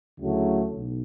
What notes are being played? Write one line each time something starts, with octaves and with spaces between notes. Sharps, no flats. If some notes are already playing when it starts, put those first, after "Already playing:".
D2 C#3 F#3 A3 E4
B1